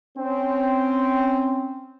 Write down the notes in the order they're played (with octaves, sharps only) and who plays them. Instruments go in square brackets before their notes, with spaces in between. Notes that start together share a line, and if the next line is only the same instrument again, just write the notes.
[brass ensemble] C4 C#4